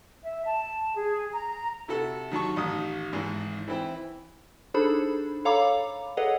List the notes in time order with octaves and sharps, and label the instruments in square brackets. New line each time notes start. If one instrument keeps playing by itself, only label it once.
[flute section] E5
A5
G#4
A#5
[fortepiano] C3 E4 F#4 A4
D#3 F#3 A5 C#6
A1 D#3 D#6
G#1 G#2 E3
E3 C4 E4 G5
[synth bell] D4 D#4 G#4 A4 C5 B5
A4 C#5 F5 A#5 B5 D6
G#4 A4 B4 C#5 D#5 F#5